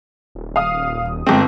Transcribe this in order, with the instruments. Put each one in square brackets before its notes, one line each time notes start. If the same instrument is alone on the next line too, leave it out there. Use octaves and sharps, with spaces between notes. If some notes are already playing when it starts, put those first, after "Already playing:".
[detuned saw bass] D#1
[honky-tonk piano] F5 D#6
[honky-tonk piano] G1 C4 [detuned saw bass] G#3